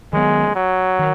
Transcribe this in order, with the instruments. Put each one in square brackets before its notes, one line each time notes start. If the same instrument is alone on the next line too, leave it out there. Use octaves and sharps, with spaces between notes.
[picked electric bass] D#3 F#3 B3 [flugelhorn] G#3
[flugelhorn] F#3
[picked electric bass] D#3